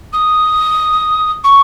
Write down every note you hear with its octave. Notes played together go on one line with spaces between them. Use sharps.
D#6
C#6